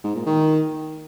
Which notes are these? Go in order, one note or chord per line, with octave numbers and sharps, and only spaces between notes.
G#2
A#2
D#3